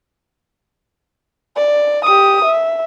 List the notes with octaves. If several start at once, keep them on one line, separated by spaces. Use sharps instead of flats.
D5
G4 D#6
E5